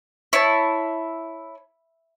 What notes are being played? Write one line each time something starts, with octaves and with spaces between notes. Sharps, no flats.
E4 C#5 A5